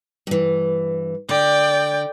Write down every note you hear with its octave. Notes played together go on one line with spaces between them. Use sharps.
G2 E3
D3 D5 G5